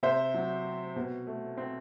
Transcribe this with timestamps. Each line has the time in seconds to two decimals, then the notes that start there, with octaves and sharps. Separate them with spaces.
0.03 C3 C5 E5
0.34 F#3
0.65 C4
0.96 B2
1.27 A3
1.57 C4